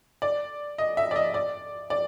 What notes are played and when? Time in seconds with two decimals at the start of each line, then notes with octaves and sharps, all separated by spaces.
0.22 D5
0.78 D#5
0.97 E5
1.11 D5
1.16 D#5
1.34 D5
1.90 D5